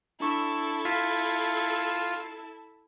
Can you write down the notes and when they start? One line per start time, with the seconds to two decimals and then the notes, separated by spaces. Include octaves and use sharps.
0.20 D4 E4 A4 C#6
0.85 F4 B6